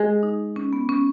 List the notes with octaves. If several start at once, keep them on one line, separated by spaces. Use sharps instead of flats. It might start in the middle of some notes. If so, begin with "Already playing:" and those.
Already playing: G#3
D#4
C#4
B3
C#4